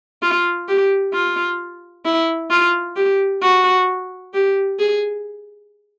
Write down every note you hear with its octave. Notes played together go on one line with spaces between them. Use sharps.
F4
G4
F4
E4
F4
G4
F#4
G4
G#4